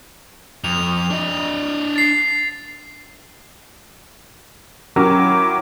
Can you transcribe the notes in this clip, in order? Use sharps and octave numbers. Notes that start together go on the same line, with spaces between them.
F2 F7
D4 D#5
A6 C7
F#3 C#4 E4 A#4 G5 D6